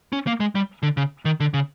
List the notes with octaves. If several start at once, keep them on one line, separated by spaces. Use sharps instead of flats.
C#4
A#3
G#3
G3
D3
C#3
D#3
D3
C#3